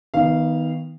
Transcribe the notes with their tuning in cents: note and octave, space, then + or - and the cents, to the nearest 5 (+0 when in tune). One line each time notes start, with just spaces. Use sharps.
D#3 +25 B3 +0 F5 -15